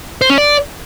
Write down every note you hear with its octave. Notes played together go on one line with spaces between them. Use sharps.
C5
C#4
D5